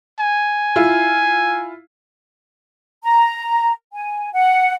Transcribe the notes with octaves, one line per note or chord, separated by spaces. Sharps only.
G#5
E4 F4
A#5
G#5
F#5